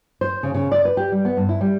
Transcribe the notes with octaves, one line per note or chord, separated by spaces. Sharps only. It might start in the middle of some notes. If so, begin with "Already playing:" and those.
C5
C#3
C#3
D5
B4
G4
G3
B3
G2
E4
G3